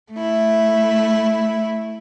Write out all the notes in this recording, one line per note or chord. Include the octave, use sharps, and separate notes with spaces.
A3 E4